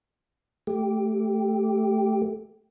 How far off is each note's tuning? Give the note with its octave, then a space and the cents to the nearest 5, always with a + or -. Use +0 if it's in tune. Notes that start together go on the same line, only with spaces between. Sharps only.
A3 -5 G4 +0